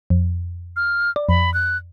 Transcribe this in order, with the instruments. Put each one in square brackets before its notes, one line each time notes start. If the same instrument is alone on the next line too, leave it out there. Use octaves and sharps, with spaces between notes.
[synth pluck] F2
[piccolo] F6
[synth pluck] D5
[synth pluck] F2 [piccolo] B5
[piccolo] F#6